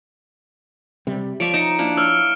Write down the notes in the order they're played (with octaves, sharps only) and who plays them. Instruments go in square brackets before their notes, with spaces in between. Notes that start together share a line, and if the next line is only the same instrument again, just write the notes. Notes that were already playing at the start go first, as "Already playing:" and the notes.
[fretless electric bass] C3 G3
[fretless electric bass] F3 [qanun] C#5 D5 E5 [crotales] D7
[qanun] D#4 [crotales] C#7 E7
[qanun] A#3 D4 E4
[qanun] C#5 [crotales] E6 F6